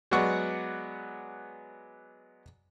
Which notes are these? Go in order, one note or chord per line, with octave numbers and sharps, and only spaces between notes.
F#3 G#3 B3 D5 F#5 C#6